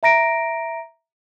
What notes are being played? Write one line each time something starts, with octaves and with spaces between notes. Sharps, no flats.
E5 A#5 A#6 D7